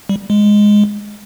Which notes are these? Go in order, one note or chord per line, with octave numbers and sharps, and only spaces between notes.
G3
G#3